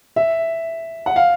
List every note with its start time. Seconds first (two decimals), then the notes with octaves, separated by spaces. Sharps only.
0.16 E5
1.06 F#5
1.16 F5